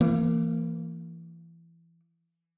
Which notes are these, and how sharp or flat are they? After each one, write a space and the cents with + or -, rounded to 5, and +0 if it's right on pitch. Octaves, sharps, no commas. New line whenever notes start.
E3 +25 A#3 -20